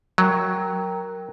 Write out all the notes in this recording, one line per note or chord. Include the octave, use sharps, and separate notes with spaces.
F#3 A#4 G5 A#5